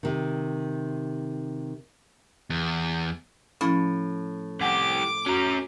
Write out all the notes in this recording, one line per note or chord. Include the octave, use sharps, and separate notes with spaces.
C3 D#3
E2
A2 F3 C#4
C2 G4 F#5 G#5 D6
C#4 F#4 A#4